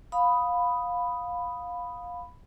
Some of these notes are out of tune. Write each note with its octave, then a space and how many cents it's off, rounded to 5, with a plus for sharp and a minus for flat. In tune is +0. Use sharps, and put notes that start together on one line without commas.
F5 +20 B5 +0 D#6 +0